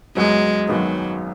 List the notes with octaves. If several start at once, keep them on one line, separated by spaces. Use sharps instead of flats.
F#1 F#2 F#3 G#3 B3 F#4
G#1 F#2 D#3 F#3 G#3 B3